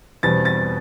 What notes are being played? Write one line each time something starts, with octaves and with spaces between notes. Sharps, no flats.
E2 B2 G3 C4 A6
A6